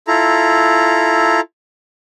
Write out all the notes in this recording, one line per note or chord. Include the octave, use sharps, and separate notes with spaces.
E4 F4 A4 A#5